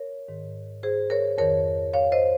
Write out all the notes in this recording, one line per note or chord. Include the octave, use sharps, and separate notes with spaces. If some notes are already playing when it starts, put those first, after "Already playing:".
Already playing: A#4 C#5
G#2 D#3
G#4 C5
A#4 C#5
F2 D#3 A#4 C#5
C#5 F5
C5 D#5